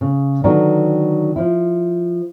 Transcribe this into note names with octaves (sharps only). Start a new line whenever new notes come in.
C#3
D3 D#3 F#3 B3 D#4
F3 E4